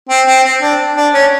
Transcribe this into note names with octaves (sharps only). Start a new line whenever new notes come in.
C4
C4
C4
D4
D4
C#4